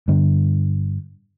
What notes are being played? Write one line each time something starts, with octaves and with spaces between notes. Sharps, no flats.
G2 D3